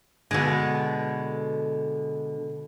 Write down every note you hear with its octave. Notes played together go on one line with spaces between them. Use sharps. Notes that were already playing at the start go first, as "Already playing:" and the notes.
B2 D3 G#3 A4